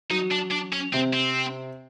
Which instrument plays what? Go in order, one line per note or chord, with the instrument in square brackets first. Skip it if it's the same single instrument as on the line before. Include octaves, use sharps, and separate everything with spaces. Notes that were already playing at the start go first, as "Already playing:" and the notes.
[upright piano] F#3 [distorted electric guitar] D#4
[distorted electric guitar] D4
D4
C#4
[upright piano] C3 [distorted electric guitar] C4
[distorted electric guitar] C4